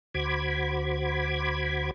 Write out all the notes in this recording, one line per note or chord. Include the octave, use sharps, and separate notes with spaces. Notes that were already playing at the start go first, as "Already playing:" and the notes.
D2 F#4 C5 B5 D6 G#6